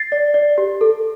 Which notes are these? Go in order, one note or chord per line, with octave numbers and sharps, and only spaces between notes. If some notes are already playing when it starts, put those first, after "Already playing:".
Already playing: A6 C7
D5
D5
G4
A4